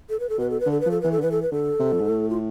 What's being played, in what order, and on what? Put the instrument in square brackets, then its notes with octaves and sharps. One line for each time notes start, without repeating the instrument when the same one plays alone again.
[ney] A4
B4
A4
[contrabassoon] B2 [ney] B4
[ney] A4
B4
[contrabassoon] D3
[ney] A4
B4
[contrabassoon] F3
[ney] A4
[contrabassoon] E3 [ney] B4
[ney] A4
[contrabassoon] D3
[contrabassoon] E3 [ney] B4
[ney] A4
B4
[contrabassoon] D3 [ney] A4
[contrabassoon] C3
F2
G#2
A2
[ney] F4